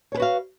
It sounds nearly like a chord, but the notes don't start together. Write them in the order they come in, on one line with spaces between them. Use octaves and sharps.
C#5 G#4 B4 F#4 F5